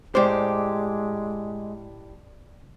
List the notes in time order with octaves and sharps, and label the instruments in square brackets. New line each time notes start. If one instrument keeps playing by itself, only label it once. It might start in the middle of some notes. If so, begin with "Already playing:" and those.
[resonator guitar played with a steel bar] A2 G4 [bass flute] G#3 [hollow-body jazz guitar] C5 [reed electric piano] D5 D6